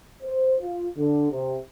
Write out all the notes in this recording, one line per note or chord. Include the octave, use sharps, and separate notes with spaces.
C5
F4
D3
C3